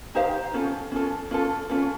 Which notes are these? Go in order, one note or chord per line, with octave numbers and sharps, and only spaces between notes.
D#4 G4 C5 F5
C#4 F4 A4
C#4 F4 A4
C#4 F4 A4
C#4 F4 A4